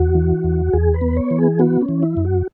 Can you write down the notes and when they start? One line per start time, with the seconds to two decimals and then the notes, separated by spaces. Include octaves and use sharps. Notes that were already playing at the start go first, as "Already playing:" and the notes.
Already playing: E2 F#4
0.15 E3
0.44 E2
0.73 E2 G#4
0.94 B4
1.01 B3
1.17 C#5
1.31 E3
1.38 G#4
1.59 B3 F#4
1.81 C#4
1.89 E3
2.03 E4
2.17 F#2
2.25 F#4